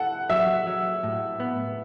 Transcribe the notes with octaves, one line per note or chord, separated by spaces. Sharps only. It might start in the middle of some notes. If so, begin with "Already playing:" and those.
Already playing: E4 A4 F#5
F#3 E5
F#3
A2
B3